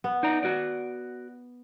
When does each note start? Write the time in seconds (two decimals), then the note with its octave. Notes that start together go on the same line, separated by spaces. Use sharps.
0.04 B3
0.23 D#4 D5 A#5
0.43 F#4 D5